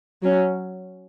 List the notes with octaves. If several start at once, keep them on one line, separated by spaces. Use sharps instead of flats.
F#3 C#4